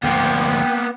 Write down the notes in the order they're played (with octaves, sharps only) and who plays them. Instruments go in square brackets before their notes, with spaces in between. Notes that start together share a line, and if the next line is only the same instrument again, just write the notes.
[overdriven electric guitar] D2 F3 [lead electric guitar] A#3 B3 [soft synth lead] G5